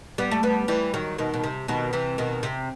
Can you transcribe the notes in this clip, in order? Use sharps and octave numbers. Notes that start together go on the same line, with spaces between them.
G3 B3
A3
G3 B3
E3 G3
D#3 F#3
B2 D#3
B2
C3
B2 D#3
C3 E3
B2 D#3
C3